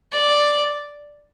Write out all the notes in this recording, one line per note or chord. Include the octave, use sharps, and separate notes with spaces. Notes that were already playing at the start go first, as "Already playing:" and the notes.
D5